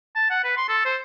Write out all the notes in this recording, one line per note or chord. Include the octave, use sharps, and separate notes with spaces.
A5
F#5
B4
C6
A4
C5